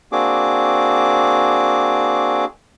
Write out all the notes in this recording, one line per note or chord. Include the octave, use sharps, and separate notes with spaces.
A#3 C4 D4 F#4 G#4 D6